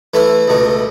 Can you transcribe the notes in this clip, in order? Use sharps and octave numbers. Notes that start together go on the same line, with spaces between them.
E3 A3 E4
C#2 B2 A3